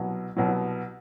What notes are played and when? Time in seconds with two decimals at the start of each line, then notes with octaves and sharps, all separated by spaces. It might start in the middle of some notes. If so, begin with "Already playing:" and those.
Already playing: C2 B2 F#3
0.37 C2 B2 F#3